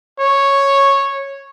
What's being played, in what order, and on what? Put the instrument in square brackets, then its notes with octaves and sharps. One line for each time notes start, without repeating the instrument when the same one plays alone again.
[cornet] C#5